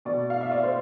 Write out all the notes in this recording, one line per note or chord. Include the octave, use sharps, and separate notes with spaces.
B2 D5
F5
E5
D5
C5